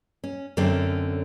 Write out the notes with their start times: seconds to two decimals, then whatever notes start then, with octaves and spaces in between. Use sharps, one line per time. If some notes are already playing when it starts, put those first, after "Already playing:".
0.24 C#4
0.57 F#2 D3 A3 C4 C#4